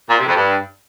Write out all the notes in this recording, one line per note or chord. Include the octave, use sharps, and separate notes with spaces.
A#2
C3
F2
G2